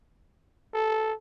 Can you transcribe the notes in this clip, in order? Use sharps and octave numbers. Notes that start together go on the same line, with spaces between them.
A4